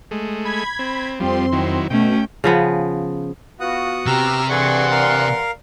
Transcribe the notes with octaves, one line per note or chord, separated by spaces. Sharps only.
G#3 A3
B5 G#6 B6
C4
F2 F3 G3 C4 C6
D#3 F#3 E4
B2 A3 C#4 G5
C#3 F3 B3
B3 F4 F#4 F#5 D#6
C3 G4 A#5 E6 F6
G2 E3 G#4 A4 D5 F#5 C6 C#6
A#4 F5